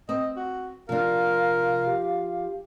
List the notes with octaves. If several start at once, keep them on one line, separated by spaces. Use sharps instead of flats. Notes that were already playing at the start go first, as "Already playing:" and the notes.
C4 D#5
F#4
C3 F3 D4 A#4 F5
G4